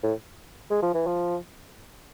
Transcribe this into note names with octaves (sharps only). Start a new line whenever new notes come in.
A2
G#3
F3
E3
F3